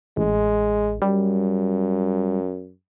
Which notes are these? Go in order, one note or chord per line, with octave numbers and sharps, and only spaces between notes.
A1 G#3
F#2 G3